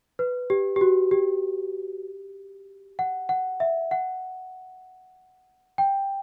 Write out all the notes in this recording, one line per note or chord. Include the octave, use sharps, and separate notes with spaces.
B4
G4
G4
F#4
G4
F#5
F#5
E5
F#5
G5